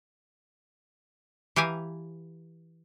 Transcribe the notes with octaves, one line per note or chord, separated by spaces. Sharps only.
E3 G4 F5 G#5 A#5